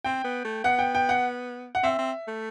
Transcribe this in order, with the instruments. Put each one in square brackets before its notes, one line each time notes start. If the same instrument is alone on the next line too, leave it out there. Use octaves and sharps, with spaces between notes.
[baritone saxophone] C4 [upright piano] G5
[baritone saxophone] B3
A3
[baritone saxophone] B3 [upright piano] F#5
[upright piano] G5
G5
F#5
F#5
[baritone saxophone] C4 [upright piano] E5
[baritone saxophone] C4
A3